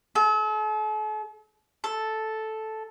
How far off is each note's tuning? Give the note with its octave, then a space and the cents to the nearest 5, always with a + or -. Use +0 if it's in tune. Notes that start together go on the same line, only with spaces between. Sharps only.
A4 -45
A4 -5